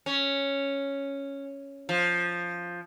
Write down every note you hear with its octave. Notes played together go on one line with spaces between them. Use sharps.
C#4
F3